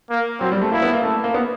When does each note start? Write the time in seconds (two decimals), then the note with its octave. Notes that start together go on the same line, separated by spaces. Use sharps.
0.10 A#3
0.40 F#3 C4
0.52 G3
0.62 A3
0.72 A#3 E4
0.82 B3
0.93 A#3
1.03 A3
1.24 A#3
1.34 B3